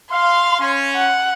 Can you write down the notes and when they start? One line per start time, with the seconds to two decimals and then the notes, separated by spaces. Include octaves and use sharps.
0.12 F5 C6
0.60 C#4
0.96 F#5